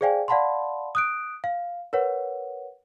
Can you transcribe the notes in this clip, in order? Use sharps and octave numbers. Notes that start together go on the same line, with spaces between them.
G#4 C5 D5 F5 G5 G#5
D5 F5 F#5 A5 B5 C6
D#6 F#6 D7
F5
A#4 B4 C#5 F#5